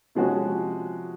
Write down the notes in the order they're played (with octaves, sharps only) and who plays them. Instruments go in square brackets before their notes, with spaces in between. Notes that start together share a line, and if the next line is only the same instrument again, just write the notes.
[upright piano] C3 F3 G#3 C#4 F#4